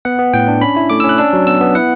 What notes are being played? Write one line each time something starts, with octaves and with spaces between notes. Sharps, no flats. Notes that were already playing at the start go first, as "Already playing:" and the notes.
B3 F#5
B3
A2 G5
D4
C#4 B5
E4
A3 D6
E6
C#4
F#6
D4 E6
F#3
B3 E6
B3
E4 F#5